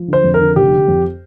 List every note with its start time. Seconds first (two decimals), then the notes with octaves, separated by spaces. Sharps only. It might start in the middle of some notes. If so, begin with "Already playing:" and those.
Already playing: F3
0.08 D3 C5
0.24 F2
0.34 A#4
0.40 D3
0.56 F1 G4
0.72 D3
0.88 F2